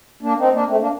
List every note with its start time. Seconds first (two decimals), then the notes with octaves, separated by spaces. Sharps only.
0.22 A#3 D4
0.38 C4 D#4
0.53 A#3 D4
0.68 A3 C4
0.79 A#3 D4